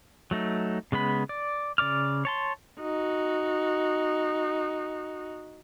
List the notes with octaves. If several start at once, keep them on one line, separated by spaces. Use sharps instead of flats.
F#3 A3 D#4
C#3 G#3 B3 B5
D5
C#3 D5 D6 F6
C#5 A5 C6
D#4 F#4